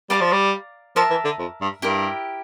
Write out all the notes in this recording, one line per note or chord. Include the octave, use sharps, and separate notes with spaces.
G3 D5 F5 A#5 D6
F3
G3
F3 A#4 E5 A5
E3
D3
F2
G2
G2 E4 G4 A#4